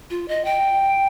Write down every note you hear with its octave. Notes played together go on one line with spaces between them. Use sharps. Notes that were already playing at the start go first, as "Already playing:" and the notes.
F4
D#5
G5